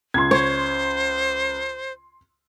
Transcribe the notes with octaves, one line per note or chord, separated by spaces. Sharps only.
C#2 C6 G#6
C5 C#5